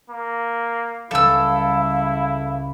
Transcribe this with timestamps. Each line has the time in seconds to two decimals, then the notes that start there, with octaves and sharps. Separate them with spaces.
0.10 A#3
1.11 C#2 G3 E4 A4 F5 E6